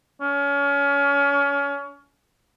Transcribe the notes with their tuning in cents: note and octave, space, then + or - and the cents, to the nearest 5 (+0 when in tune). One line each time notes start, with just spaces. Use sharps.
C#4 +30